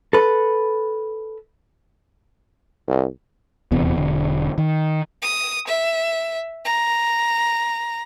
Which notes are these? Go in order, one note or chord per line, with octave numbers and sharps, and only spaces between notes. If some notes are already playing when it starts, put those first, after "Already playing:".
A4 B4
C2
D#1 E2 C3 B3
E1 D3
D#3
D#6
E5
A#5